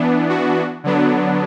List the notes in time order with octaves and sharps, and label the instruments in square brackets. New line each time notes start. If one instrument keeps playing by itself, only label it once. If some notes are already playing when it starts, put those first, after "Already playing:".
Already playing: [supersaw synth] E3 B3 D4
F#4
D3 F#3 B3 D4